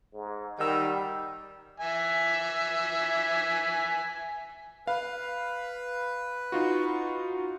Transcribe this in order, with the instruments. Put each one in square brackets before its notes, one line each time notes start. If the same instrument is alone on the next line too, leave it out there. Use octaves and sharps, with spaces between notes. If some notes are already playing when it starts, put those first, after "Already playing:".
[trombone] G#2
[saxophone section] D#3 [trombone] G3 [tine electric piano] F#5 E6
[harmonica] E5 G#5
[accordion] B4 [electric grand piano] F5
[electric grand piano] D#4 F4 F#4